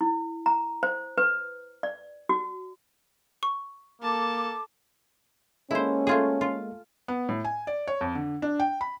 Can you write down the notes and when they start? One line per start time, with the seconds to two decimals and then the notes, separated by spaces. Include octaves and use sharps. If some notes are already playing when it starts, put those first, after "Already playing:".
0.01 E4
0.46 A#5
0.83 C5
1.18 B4
1.83 D5
2.29 F#4
3.43 C#6
4.02 A#3 A4 A5 D6
5.71 G#3 A#3 C#4 E4 A4 C5
6.07 A3 F4 G#4
6.41 F4
7.08 B3
7.29 A2
7.44 G#5
7.67 D5
7.88 C#5
8.01 F2
8.15 D3
8.42 D4
8.60 G5
8.81 B5